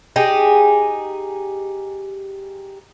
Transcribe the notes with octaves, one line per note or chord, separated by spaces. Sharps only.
D#4 G4 G#4